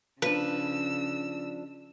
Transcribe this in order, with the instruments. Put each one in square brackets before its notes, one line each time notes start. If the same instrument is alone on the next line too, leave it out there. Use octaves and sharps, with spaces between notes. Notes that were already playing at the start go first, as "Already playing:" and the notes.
[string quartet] C#3 E6 [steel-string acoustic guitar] F3 D4 [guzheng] B4